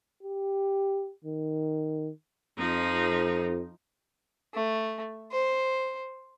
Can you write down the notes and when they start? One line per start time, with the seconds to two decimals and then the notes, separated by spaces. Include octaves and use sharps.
0.23 G4
1.24 D#3
2.58 F2 F3 D#4
4.54 A3
5.31 C5